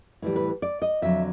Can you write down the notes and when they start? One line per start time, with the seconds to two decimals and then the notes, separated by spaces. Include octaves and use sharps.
0.22 A2 E3 G3
0.36 B4
0.62 D5
0.82 D#5
1.02 F2 D3 F#3 E5